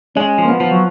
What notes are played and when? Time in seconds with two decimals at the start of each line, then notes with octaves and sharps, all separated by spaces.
0.16 G#3 C#4
0.38 F3
0.45 A#3
0.49 B3
0.60 F3
0.71 F#3